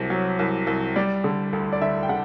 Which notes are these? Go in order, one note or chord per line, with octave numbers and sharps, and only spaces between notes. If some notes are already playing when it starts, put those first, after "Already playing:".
Already playing: C2 C3 F#3
F#3
C2
C2
G3 D5
D3
D2
D5
D2 E5
G5
D3 F#5